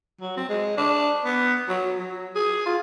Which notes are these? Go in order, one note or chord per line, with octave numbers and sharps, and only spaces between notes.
F#3
C4
G#3
D4
B3
F#3
F#3
G#4
F4